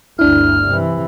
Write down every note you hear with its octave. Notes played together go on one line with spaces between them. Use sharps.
G1 D2 D4 E4 F6
C3 E3